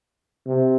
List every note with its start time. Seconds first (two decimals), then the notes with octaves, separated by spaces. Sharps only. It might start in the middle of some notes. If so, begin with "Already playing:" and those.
0.47 C3